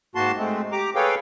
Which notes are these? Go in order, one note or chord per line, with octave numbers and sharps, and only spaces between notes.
G#2 D#3 A#3 F#4 A5 C6
G#3 A3 C4
G4 A#5 D6
G#4 A4 B4 C#5 F5 G5